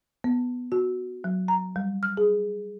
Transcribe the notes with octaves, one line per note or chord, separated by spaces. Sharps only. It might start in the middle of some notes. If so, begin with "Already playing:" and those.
B3
F#4
F#3
A#5
G3
F6
G#4